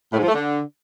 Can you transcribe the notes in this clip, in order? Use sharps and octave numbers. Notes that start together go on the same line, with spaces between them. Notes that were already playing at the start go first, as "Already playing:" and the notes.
A2
G#2
F3
A3
D3